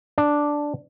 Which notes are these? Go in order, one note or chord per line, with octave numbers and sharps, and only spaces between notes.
D4